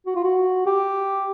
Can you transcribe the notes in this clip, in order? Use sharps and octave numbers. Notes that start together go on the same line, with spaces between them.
F#4
F4
F#4
G4